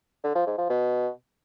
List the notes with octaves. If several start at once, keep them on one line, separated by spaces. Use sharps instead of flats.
D3
F3
G#2
F3
B2